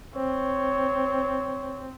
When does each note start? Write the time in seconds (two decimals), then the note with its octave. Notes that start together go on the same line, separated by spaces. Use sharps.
0.15 C4 C#5